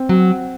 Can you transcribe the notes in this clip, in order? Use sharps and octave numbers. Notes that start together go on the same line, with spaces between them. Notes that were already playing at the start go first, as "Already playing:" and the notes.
Already playing: C4
F#3